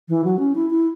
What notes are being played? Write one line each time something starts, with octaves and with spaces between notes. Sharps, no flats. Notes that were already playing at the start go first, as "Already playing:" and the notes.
E3
F#3
C#4
E4
E4